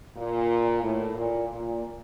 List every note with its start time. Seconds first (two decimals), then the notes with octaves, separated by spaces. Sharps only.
0.17 A#2
0.82 A2
1.16 A#2
1.48 A#2